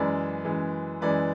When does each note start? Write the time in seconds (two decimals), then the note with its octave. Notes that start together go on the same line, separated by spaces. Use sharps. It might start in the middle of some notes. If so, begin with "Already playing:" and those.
Already playing: F#2 E3 G#3 B4 D5
0.45 F#2 E3 G#3
1.01 F#2 E3 G#3 B4 D5